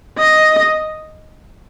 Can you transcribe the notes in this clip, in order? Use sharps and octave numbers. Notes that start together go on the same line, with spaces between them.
D#5